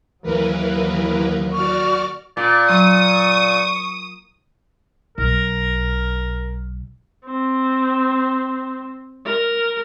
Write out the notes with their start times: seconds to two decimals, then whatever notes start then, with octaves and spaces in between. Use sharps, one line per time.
0.23 D#2 E3 F#3 A#4 B4
1.52 F#4 D5 C#6 F6
2.37 A#2 D5
2.70 F#3 C#6 D#6
5.18 B1 A#4
7.25 C4
9.26 A#4